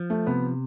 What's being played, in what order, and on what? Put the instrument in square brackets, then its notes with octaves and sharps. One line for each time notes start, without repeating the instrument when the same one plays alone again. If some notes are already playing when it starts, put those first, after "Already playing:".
Already playing: [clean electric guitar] F3
[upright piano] A3
[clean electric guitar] C3 [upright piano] B3